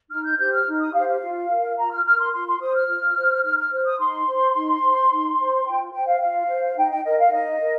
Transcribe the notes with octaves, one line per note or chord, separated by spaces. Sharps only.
D#4 F6
G6
G4 C5 G6
F6
D#4
D#6
G4 C5 F5
F5
F4
A#4
F4 A#5
F6
A#4 F6
C6
F4 C6
C6
C5 D#6
F6
F4
C5
D#4 F6
F6
C5
D#6
D#4 C6
C5
D#4
C5
D#4
C5
F4 G5
C5 G5
F5
F4 F5
C5
D#4 G5
G5
A#4 D#5
F5
D#4 D#5
A#4